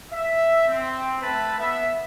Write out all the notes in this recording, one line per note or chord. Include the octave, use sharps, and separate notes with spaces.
E5
C4
A3 B4 E5 A5 B5
B3 E5